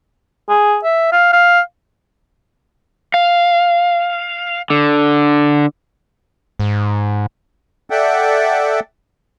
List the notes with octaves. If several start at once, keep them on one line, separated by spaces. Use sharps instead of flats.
G#4
E5
F5
F5
F5
D3
G#2
A4 D5 E5 F#5 G5